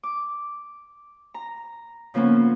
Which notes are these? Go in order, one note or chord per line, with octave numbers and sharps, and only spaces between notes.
D6
A#5
C#3 F3 A#3 B3 C#4